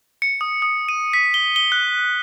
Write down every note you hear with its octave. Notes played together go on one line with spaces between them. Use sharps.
C#7
D#6
D#6
D#7
B6
G7
G7
F#6